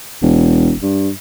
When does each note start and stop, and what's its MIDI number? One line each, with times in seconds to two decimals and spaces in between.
0.23 0.73 28
0.82 1.10 43